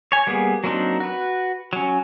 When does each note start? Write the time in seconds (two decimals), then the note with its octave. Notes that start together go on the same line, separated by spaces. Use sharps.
0.12 C#5 G#5
0.27 G3 A#3 B3 G#4
0.64 F#3 A#3 C4 D4 D#4
1.00 F#4 B4
1.73 F#3 C#4